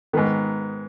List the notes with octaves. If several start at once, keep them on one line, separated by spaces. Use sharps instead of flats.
G#2 D#3 B3